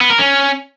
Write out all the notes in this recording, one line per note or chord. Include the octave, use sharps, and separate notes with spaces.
B3
A#4
C#4